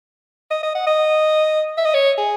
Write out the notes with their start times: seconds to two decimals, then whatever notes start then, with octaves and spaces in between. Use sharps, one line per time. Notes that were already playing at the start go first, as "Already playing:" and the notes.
0.51 D#5
0.63 D#5
0.75 F#5
0.87 D#5
1.77 E5
1.86 D#5
1.94 C#5
2.18 G#4